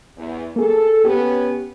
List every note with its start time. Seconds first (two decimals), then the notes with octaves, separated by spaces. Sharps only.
0.16 E2
0.56 A#3 G#4 A4
1.05 B3 C#4 G4